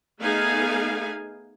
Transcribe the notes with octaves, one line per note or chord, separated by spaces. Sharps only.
A3 B3 D#4 G#4 F5 G#5